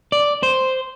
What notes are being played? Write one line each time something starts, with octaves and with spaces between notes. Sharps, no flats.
D5
C5